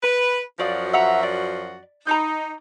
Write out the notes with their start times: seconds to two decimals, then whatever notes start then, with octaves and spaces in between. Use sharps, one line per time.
0.03 B4
0.60 F#2 F3 F#4 D5 F5 D#6
0.93 E5 F#5 A#5
1.23 D5
2.07 D#4 A#5 D6 G6